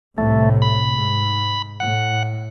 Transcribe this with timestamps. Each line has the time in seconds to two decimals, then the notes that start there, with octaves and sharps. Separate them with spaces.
0.18 C2 A2 C3 A3
0.62 B5
0.93 G#2
1.80 A2 F#5